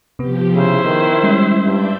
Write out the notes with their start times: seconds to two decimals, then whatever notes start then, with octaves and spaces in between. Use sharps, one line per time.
0.19 C3 F3 B3 G4
0.54 C#3 E4 C5 E5
0.85 D#3 B3
1.23 G3 G#3 C#4
1.65 G2 D5 E5 G6